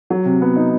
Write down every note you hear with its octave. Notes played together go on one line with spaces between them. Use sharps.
F#3
C3
B3
D#4